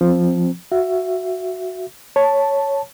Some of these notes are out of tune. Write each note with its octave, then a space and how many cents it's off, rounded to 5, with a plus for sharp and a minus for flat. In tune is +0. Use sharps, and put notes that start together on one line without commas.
F3 +0 C4 +0
F#4 +0 E5 +20
C#5 +0 A5 +0